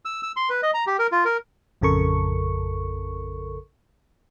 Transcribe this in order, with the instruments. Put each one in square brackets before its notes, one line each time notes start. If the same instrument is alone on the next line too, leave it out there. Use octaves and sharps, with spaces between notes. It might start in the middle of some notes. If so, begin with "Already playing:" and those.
[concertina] E6
E6
C6
B4
D#5
A#5
G4
A#4
F4
A#4
[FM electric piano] A1 F2 C#3 A4 A#4 C#6